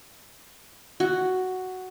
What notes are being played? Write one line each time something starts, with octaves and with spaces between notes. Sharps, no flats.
F#4